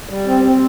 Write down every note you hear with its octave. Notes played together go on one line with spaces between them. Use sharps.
G3
C4
C4